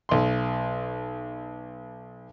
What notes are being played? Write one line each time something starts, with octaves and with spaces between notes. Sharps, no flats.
B1 C6